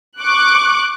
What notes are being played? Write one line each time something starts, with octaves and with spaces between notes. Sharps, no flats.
C#6 D6 F#6